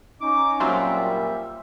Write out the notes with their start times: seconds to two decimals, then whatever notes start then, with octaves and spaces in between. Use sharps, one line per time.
0.21 C#4 D#4 D6
0.60 A#2 F#3 G3 C4 F4 E5